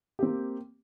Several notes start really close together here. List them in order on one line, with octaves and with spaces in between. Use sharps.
G4 C4 A#3